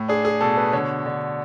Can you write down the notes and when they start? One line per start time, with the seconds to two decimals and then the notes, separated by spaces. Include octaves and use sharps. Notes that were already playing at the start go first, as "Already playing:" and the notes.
Already playing: A2
0.08 D4 G#4
0.25 G#4
0.41 B2 A4
0.57 B4
0.73 D3 C#5
1.06 D3